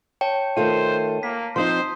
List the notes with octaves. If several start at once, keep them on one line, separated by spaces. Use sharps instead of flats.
C#5 G5 A5
D#3 A3 F4 C5 D#7
A#3 B6
F3 C4 D#4 C5 C6 D#6